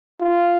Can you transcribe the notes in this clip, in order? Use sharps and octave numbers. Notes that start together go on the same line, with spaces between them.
F4